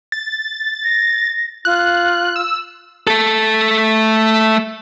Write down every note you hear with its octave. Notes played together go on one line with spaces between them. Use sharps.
A6
A#6
F4 F#6
E6
A3 A4